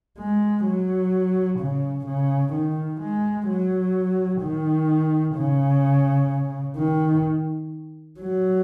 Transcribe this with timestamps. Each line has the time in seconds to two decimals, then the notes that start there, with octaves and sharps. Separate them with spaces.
0.19 G#3
0.66 F#3
1.60 C#3
2.07 C#3
2.54 D#3
3.02 G#3
3.48 F#3
4.42 D#3
5.37 C#3
6.78 D#3
8.20 F#3